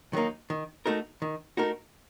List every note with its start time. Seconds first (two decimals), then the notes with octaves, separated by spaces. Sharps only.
0.13 D#3 F#3 A#3 D#4
0.50 D#3
0.86 A3 D#4 F#4 A#4
1.22 D#3
1.57 A3 D#4 F#4 A#4